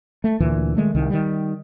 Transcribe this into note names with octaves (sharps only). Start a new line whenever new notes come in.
A3
D2 A#2 E3
D#3 G#3 A3
C2 D#3
D#3 G3